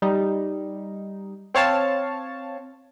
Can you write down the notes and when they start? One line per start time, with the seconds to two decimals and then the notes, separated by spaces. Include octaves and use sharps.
0.02 G3 D#4
1.54 C4 C#5 F5 A5